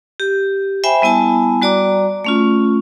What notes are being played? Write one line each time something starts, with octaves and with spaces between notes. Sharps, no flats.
G4
C5 E5 G5 G#5 B5
G3 B3 E4 G#5 A5
G3 F#4 D5 A#5 D6
A3 C#4 F4